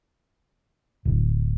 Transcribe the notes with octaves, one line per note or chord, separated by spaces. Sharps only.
D1